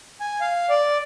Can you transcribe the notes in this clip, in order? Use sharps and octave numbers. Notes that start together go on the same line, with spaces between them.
G#5
F5
D5